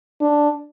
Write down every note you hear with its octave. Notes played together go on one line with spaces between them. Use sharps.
D4